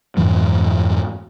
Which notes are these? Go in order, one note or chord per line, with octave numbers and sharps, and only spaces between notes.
F2 G#2 E3 F#3